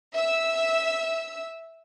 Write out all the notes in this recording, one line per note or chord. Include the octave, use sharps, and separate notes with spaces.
E5 E6